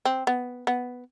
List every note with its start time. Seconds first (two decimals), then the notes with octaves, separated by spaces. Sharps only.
0.05 C4
0.27 B3
0.67 B3